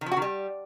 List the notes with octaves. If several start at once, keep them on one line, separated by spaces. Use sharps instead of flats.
D#3
F3
F#4
D#3
G3